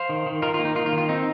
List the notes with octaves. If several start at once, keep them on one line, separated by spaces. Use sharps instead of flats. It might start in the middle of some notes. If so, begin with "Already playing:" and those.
Already playing: C5 F5
D#3
D#3
D#3 F4 A#4
F4
A#3
D#4
D#3 F4
F4
D#3
F4
C4 D#4